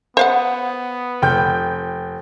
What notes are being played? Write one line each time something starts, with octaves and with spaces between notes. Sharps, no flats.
B3 C5 F5 F#5
F1 G5 G6